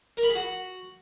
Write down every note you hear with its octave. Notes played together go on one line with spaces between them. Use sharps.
A#4
B5
G#4
F#4